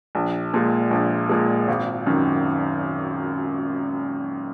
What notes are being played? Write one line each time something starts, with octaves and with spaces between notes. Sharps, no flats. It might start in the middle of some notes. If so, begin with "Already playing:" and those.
A#1
A#2 G#3
A#1
A#2 G#3
G#1
F#2 D#3